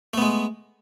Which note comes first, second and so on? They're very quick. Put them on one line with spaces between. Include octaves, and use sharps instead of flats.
A3 B3 G#3